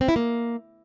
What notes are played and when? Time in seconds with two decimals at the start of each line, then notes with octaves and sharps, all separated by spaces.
0.01 C4
0.08 E4
0.16 A#3